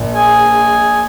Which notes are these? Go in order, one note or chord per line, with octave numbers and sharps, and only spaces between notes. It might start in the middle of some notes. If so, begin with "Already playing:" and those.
Already playing: A#1 A#2 A#3
G#4 G#5